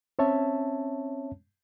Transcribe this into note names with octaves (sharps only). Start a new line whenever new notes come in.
C4 C#4 C#5 E5 A5